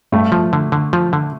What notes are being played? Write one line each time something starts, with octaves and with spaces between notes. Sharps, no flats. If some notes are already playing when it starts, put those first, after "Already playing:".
G2 A3
F3
D3
D3
F3
D3